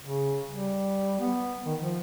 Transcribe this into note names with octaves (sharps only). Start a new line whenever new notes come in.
C#3
G3
B3
D#3
F3